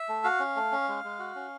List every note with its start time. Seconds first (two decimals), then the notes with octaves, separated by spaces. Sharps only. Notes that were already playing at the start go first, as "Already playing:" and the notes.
Already playing: E5
0.09 A3
0.24 F#4 F5
0.40 C#4
0.56 A3
0.72 C#4
0.88 G#3
1.04 G#3
1.19 F#4
1.35 C#4